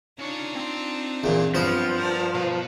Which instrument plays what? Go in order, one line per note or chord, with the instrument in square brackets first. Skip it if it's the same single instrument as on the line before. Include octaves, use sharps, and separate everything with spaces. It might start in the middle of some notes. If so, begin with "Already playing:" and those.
[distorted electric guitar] C#3 C#5 [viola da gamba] D4 D#4 F4
[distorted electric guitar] C4 C6
[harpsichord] E2 A#2
[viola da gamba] G2 F#3 [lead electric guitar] F3 [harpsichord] B3 C5
[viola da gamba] A#4 D5
[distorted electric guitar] B2 B4